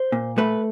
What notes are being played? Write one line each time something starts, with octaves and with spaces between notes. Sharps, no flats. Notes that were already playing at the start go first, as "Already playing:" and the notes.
Already playing: C5
A#2
A3 B4